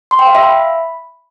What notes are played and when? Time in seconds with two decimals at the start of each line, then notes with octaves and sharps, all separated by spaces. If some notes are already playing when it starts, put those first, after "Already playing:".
0.11 C6
0.19 G5
0.27 F5
0.35 E5
0.43 B5